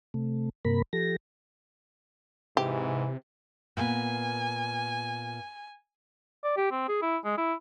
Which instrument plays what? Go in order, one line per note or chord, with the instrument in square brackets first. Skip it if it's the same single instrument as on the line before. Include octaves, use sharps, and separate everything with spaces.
[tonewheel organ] C3 A3
G2 C3 A#3 A#4 B5
F3 G4 A4 A#6
[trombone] G#2 [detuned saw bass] C3 [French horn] E3 [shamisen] G4
[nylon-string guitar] A#2 B3 [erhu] G#5
[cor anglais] D5
G4
C4
G#4
E4
G#3
E4